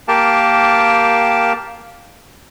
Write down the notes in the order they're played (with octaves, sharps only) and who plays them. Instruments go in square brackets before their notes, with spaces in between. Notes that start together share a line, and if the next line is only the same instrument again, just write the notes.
[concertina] A#3 G4 A#4 F5 G5 A5